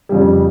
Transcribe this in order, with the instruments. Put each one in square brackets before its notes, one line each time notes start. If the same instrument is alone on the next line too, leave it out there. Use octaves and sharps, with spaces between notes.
[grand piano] F2 C#3 G3